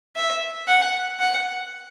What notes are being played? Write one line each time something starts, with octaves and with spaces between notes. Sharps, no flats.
E5
F#5
F#5